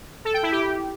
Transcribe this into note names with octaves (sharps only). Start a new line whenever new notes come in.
A4
G5
E4
G4